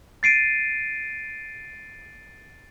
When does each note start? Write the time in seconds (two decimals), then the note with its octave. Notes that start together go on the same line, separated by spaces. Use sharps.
0.23 A6 C7 D7 D#7